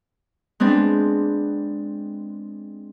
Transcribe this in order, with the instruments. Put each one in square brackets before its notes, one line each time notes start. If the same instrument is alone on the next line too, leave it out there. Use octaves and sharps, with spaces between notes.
[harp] G#3 B3 C4 D4